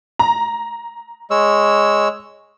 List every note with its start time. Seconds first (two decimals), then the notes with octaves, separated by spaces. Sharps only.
0.19 A#5
1.31 G#3 C#5 E6